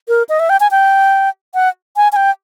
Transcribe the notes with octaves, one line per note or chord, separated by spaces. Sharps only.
A#4
D#5
E5
G5
G#5
G5
F#5
G#5
G#5
G5